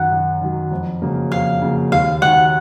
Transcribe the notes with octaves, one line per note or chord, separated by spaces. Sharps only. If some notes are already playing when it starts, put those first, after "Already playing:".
Already playing: F#2 D#3 F#3 F#5
F#2
D#3 F#3
F2
C#3 F#3 A#3
F2 F5
C#3 F#3 A#3
D#2 F5
D#3 F#3 F#5